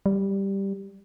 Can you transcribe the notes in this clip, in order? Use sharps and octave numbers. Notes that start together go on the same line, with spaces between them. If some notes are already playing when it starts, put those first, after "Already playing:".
G3